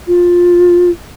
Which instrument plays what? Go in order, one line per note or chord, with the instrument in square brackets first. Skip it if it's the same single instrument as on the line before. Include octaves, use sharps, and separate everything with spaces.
[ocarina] F4